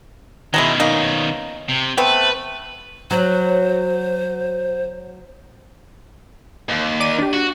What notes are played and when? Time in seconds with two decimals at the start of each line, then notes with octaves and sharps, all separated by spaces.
0.54 B2 D#3 F#3 G#3 E4
0.80 A#3 C#4 D#4
1.68 C3
1.97 A3 B3 C4 B4
3.11 F#3 C5
6.69 D#2
7.00 D5 D6 D#7
7.18 D4 G4
7.33 F#4